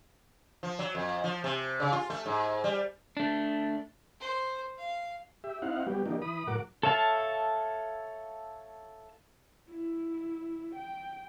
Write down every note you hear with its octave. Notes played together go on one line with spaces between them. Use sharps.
F3
F#3
F2
F3
C3
C#3
F4
A3
G#2
G3
A3 D4
C5
F5
G4 E5
C4 D#4 E4 F5 F#5
F#3 G3 B3 G4
E3 F#3 A#3 D4 D#4 G4
E3 B5 D#6
A2 F#3 A#4 F#5 D6
A4 C#5 E5 F5 A5
E4
G5